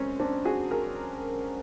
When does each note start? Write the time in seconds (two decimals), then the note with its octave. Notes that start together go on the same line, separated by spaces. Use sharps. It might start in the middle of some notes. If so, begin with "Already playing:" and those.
Already playing: F#2 G#3 C4 C#4
0.20 C4 D4
0.45 F#4 G#4
0.71 G#4 A#4